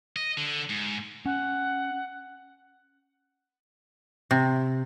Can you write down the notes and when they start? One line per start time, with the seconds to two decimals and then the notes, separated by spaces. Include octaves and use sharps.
0.16 D#5
0.37 D3
0.69 G#2
1.25 C#4 F#5
4.31 C3